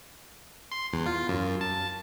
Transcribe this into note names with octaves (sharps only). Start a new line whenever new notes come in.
C6
E2
F4
F#2
A5